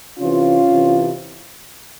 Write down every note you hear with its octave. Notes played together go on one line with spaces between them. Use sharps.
C3 E3 C#4 F4
C3 E3